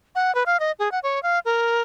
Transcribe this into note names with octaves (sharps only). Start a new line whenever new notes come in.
F#5
B4
F5
D#5
G#4
F#5
C#5
F5
A#4